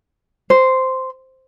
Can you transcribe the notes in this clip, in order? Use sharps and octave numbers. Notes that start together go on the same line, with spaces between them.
C5